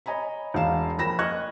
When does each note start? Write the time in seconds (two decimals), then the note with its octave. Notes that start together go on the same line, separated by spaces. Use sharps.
0.06 C#5 D#5 G#5 A#5 B5
0.54 E1 C#5 F5 E7
0.98 F2 A#3 B5 A#6 E7
1.19 D#5 C#6 F6 F#6 G#6